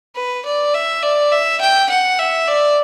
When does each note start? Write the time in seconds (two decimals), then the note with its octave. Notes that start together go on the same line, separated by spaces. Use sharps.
0.16 B4
0.46 D5
0.74 E5
1.03 D5
1.32 E5
1.61 G5
1.90 F#5
2.19 E5
2.48 D5